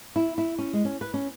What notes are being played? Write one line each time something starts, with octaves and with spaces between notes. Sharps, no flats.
E4
E4
C#4
G#3
C#4
B4
C#4